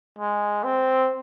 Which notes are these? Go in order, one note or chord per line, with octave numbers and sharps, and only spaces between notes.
G#3
C4